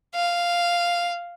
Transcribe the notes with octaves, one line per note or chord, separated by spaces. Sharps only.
F5